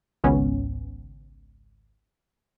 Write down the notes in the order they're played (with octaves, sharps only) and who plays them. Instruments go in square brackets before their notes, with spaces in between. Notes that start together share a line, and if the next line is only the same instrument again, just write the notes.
[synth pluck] G#1 C#2 B3 C#4